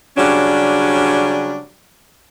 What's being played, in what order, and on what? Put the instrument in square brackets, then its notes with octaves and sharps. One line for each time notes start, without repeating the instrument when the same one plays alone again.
[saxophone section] C#3 F#3 G3 C#4 D4